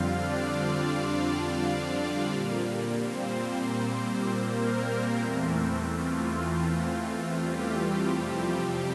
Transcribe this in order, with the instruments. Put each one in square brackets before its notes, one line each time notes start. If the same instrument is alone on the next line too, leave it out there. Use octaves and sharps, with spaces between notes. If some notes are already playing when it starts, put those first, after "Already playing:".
Already playing: [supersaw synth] F2 D3 G3 C4 F4 F5
D4 D5
A#2 G3 A#3
C4 C5
A#3 A#4
E2 E3 A3 C4
F4
G3 G4
F2 C3 F3 G3 C4 G4